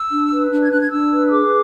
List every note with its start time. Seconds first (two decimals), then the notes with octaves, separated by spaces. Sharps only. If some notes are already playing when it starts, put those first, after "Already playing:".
Already playing: E6
0.11 D4
0.31 B4
0.51 D4
0.62 G#6
0.71 D4 F#6
0.81 G#6
0.91 D4 E6
1.12 B4
1.27 E6
1.32 G#4 D6